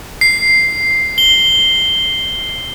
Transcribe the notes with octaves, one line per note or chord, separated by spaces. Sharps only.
C7
G7